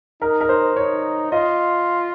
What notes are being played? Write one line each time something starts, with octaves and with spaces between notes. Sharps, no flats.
D#4 A#4
A#4
C5
D#4 C#5
F4 D#5